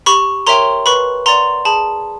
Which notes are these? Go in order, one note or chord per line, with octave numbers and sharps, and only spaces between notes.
G4 B5 C#6
A#4 C#5 E5 G5 A#5 C6
B4 B5 C#6
D5 F#5 A#5 C6
G#4 A5 B5